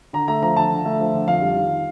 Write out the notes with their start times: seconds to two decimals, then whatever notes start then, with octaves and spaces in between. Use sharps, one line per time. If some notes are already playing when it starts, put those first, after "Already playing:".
0.13 D3 A#5
0.28 A3 A#5
0.42 F3 A#5
0.56 D3 A5
0.71 D3
0.85 A3
1.00 F3
1.14 D3
1.28 F2 F5
1.41 G3
1.56 D#3